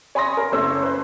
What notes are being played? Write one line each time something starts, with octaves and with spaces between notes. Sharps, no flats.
C#5 G#5 B5 C6 D#6 A#6
A#4
F#1 A3 C5 C#5 E6
B4 C5